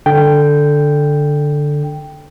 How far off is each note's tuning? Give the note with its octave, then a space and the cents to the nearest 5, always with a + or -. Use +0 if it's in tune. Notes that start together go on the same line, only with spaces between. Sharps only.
D3 +0 G5 +0